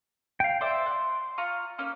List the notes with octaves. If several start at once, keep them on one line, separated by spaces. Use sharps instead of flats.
F5 G5
C5 D5 E5 C6
F#5
F4 A#5 C#6
A#3 C#4 D#4